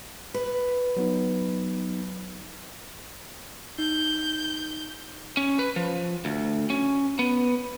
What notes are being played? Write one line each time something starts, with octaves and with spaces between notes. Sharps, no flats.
B4
F#3 B3 D#4
D#4 G6
C#4
B4
F3
D2
C#4
B3